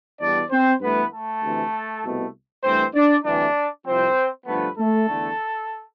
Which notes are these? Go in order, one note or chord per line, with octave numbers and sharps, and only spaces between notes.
E2 B2 G3 D4 D5
C4 C5
G2 E3 A3 B3 B4
A3 A4
D2 C3 E3
C2 B2 A3
G2 E3 A3 C4 C5
D4 D5
D2 C3 E3 G3 D4 D5
C2 C3 F3 C4 C5
G2 D3 F3 A3 B3 B4
A3 A4
E2 D3 A3